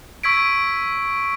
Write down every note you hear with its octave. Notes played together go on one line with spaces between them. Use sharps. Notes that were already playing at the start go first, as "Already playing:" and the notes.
C#6 E6 G#6 B6 D7